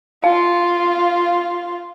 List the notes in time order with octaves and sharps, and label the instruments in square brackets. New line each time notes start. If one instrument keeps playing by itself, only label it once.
[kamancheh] F4 [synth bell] F5